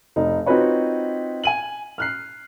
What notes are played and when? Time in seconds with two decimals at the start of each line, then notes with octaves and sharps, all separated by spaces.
0.16 F1 D#4
0.46 C4 D#4 F4 F#4 B4 C#5
1.44 G#5 D#7 F#7
1.98 F6 F#6 C7